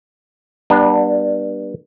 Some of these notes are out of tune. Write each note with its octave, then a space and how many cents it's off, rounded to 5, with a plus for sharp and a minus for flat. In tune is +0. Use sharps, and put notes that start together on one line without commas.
G3 +0 B3 -30 D4 +20